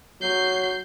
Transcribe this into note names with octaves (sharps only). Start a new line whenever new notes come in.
F#3 G6 C7